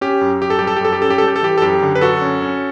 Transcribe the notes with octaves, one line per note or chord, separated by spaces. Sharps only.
C#4 G4
F#2
F#2 G4
A4
G3 G4
A4
G4
F#2 A4
G4
C#4 A4
G4
G3 A4
G4
A4
E3 G4
A4
F#2 G4
D3
B4
F#2 F#4 A4
C#4
C#4